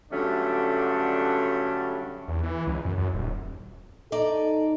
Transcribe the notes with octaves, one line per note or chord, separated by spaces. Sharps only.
G2 D3 F#3 A3 C#4 D4
E2
E3
C#2
F#2
F#2
D#1
D#4 A4 D5